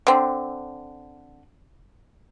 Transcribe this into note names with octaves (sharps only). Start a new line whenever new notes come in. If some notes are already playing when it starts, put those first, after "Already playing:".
D3 C4